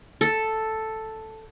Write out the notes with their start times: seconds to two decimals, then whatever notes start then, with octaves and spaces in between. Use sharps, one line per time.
0.21 A4